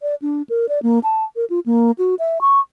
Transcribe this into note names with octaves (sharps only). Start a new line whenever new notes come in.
D5
D4
A#4
D5
A#3
A5
A#4
F4
A#3
F#4
E5
C#6